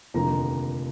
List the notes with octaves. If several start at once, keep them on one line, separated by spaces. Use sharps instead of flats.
F1 D#2 D3 F3 A#5